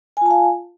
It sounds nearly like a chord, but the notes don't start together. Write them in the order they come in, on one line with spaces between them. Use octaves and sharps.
G#5 F4 A5 F5